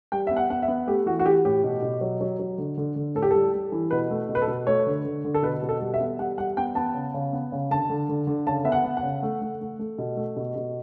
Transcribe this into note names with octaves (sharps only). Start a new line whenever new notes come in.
G3 G5
B3 E5
F#5
B3 F#5
E5
B3
A3 G4
E3 F#4
F#4
E3 G4
A2 G4
B2
B2
F#3
F#3
F#3
D3
D3
D3
A2 A4
G4
G3 A4
G3
E3
B2 B4
A3
B2
B4
A4
B2
A3 C#5
D3
D3
D3
A4
B2 B4
B2
A4
G3
E5
B3
G3 F#5
G3 F#5
B3 G5
B3 A5
C#3
C#3
B3
C#3
D3 A5
D3
D3
D3
C#3 A5
B3 E5
F#5
B3
F#5
C#3
A3
A3
A3
A3
B2
A3
B2
B2